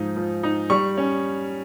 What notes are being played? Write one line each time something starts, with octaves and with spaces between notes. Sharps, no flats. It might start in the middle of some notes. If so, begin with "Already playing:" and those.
Already playing: G#2 F3 D#4
F3
D#4
G3 C#6
C#4